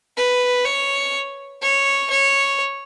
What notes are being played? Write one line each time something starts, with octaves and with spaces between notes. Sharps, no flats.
B4
C#5
C#5
C#5